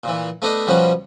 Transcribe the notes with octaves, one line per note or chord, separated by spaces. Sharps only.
A#2 E3
A3 B3 D4 D5 D#5
B2 F3 G3 C#4 F#4